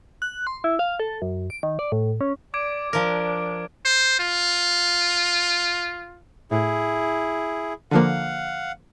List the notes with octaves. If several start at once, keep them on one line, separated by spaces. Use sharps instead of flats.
F#6
C6
E4
F5
A4
F#2
D7
D#3
D5
A2
C#4
D5 D6 G#6 D7
F3 D4 A#4
C5
F4
A2 E4 G#4
D3 F3 A#3 F5 F#5